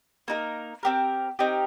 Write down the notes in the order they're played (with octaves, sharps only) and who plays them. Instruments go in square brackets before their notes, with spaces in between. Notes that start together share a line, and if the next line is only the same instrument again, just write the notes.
[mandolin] A#3 D#4 A#4
C4 G4 A#4
C4 D#4 G4 A#4